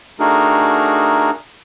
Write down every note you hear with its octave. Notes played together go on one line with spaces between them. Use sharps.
A3 D4 D#4 F#4 G#4 A#4